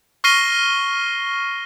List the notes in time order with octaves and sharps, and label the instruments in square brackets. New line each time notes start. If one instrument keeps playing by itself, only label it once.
[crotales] C#6 F6 A#6 C7 D#7 G7